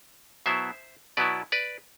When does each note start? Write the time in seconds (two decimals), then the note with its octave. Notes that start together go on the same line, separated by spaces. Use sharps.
0.46 B2 F#3 B3 E4 C5 E5
1.17 B2 F#3 B3 E4 B4 D5
1.52 B4 D5